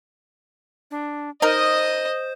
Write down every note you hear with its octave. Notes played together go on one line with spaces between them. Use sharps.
D4
D#4 A#4 C5 D#5 D#6